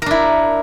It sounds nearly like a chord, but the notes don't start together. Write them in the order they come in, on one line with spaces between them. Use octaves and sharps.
A#4 D4 E4